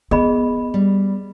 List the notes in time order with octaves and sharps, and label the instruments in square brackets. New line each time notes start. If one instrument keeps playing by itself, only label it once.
[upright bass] B3 [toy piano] G#4 D#5 B5
[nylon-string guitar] G3